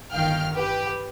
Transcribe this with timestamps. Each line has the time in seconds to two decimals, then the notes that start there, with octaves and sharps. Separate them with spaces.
0.11 G1 D#3 F5 G5 F6
0.53 G4 B4